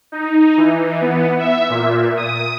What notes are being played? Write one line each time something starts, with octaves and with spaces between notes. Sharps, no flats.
D#4
E3
B3
E5
A#2
D#6